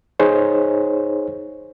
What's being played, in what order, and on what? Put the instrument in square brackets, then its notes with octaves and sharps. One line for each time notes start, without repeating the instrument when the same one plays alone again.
[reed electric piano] D#4 G#4 C5 C#5